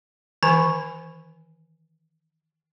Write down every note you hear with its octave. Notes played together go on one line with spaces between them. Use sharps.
D#3 E3 G#5 A#5